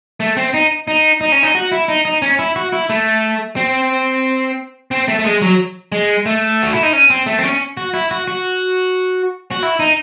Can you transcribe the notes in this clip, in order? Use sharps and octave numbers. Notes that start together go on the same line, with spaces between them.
A3
C4
D#4
D#4
D#4
C#4
D#4
F#4
E4
D#4
D#4
C#4
E4
F#4
E4
A3
C4
C4
A3
A3
G#3
F#3
G#3
A3
F#4
E4
D#4
C#4
C4
A3
C4
C#4
F#4
E4
F#4
F#4
F#4
E4
D#4